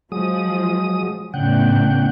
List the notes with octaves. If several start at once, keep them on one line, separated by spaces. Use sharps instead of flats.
F3 F#3 G#3 D#6
E2 A2 C#3 D4 F#5 G5